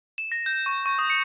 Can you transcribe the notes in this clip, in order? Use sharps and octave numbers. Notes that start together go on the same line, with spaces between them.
E7
A#6
G6
C#6
C#6
D#6
C#7